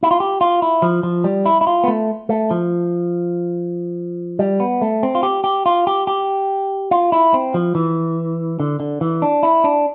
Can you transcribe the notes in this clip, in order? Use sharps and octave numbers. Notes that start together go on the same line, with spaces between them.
E4
F4
G4
F4
E4
F3
F3
G3
E4
E4
F4
B3
A3
A3
F3
G3
B3
A3
C4
F4
G4
G4
F4
G4
G4
F4
E4
C4
F3
E3
D3
D3
E3
D4
E4
D4